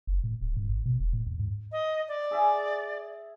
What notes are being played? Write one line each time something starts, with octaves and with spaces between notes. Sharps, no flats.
F#1
A2
D1
G#2
G#1
B2
E1
A2
D#2
G#2
D#5
D5
G#4 E5 G#5